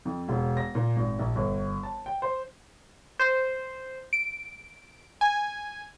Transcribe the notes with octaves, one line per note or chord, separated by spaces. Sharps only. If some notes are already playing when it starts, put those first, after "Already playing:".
F2
E1
A#6
A#2
G#1
A#1
G1
A5
G5
C5
C5
D7
G#5